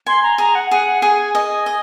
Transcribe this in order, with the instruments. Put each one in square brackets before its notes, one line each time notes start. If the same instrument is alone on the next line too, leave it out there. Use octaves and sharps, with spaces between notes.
[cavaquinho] G#5 [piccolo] C6
[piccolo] A#5
[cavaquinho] G#4 [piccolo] A#5
[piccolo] F#5
[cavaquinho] G#4 [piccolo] F#5
[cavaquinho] G#4 [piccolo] G#5
[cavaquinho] D#5 [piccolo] G#5
[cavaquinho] D#5